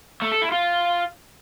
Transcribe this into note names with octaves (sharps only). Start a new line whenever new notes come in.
A3
A4
E4
F4